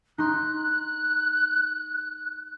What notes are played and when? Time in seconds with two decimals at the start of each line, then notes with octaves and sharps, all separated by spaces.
0.18 D#4 C6 F#6